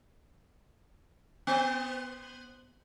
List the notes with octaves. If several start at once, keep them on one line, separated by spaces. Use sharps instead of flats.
B3 C5